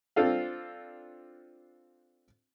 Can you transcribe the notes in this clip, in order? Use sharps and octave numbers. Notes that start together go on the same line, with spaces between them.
C4 D4 F4 A4 F5